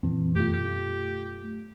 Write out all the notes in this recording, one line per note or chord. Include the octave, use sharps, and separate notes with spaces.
F2 A#2 E3 C4
F#2 B2 A3 F4 G4
G4